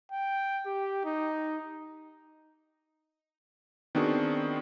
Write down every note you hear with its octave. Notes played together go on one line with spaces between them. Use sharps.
G5
G4
D#4
D#3 B3 C4 D4 F#4 G#4